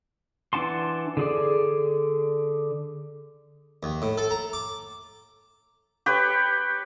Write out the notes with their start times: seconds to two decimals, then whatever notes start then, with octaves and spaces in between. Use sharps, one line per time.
0.53 E3 D4 F#5 A5 C6
1.17 D3 G#4 D5
3.83 D#2
4.02 A2
4.18 A4
4.31 A#5
4.53 D6
6.06 G4 B4 C#5